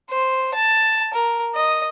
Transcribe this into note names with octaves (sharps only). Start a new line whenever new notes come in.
C5
A5
A#4
D#5